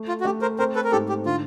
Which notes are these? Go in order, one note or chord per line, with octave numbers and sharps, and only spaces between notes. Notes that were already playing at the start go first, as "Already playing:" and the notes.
Already playing: A3
F4
F#4
A3 G4
A#4 C5
C4 A#4 C5
A4 B4
A#4
G#2 G4 A4
G4
D3 F4